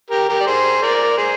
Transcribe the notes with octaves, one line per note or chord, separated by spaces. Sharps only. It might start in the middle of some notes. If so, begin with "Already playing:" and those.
G4 A#4
G4 A#4
D5
G#4 C5
A#4 D5
G#4 C5